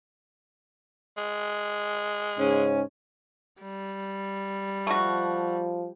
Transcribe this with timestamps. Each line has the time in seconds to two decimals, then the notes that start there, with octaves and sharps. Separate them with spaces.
1.17 G#3
2.38 G#2 C#3 C#4
3.62 G3
4.87 F3 A3 F#4